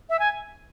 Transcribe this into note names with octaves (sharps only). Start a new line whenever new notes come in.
E5
G#5